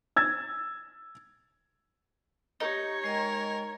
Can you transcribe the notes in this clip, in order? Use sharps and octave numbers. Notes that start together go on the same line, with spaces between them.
E6 G#6 A6
D#4 G4 C#5 D#5
G#3 A#4 D#5 G5